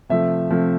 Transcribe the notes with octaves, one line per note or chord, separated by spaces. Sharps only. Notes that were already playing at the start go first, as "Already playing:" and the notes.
C3 F3 A3 E5
C3 F3 A3